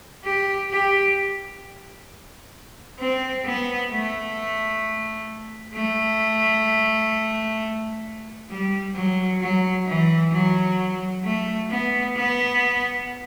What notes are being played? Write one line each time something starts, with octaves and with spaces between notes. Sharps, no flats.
G4
G4
C4
B3
A3
A3
G3
F#3
F#3
E3
F#3
A3
B3
B3